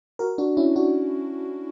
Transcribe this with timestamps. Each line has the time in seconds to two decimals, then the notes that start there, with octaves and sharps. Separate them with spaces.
0.19 F#4 A#4
0.38 D4 F#4
0.57 C#4 E4
0.76 D4 F#4